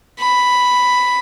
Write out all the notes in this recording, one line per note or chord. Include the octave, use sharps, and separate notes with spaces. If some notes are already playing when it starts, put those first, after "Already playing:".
B5